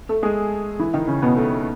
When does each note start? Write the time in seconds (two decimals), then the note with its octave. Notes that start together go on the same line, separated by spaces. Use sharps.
0.09 A3 A4
0.23 G#3 G#4
0.79 E3 E4
0.94 D#3 D#4
1.07 C#3 C#4
1.22 B2 B3
1.36 A3
1.51 A3